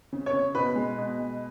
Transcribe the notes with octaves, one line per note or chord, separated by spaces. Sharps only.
C#3
C#5
C#3
B2 B4
G#3
B2
G#3